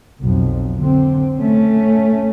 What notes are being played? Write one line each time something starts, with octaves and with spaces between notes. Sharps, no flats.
B1 F2
D3 C4
A3 C#4